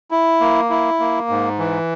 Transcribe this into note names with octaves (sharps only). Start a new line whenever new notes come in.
E4
A#3
E4
A#3
G#2
E3